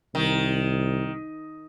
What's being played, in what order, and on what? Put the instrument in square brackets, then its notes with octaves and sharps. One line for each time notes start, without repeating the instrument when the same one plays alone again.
[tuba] C2 [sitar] D#3